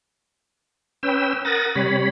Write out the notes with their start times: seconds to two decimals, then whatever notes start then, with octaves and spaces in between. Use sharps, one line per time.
1.03 C#4 B4 G5 E6
1.45 A#4 F#5 D#6 A6 A#6
1.75 C3 G3 C#5 B5